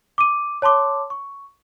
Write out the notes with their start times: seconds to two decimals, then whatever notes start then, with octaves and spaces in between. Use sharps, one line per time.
0.18 D6 D#7
0.62 C#5 A5 C6 D6
1.10 C#6